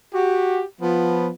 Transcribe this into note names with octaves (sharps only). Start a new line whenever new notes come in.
F#4 G4
F3 B3